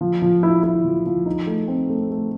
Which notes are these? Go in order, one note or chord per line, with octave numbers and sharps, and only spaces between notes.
F3
F3
E4
E4
F3
F3
D#4
A3
C4
A3
A3